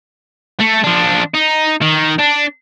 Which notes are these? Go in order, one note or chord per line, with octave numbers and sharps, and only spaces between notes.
A3
F3 D4
D#4
D#3
D4